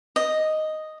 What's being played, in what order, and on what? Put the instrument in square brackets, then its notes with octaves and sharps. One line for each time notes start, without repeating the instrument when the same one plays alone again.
[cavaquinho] D#5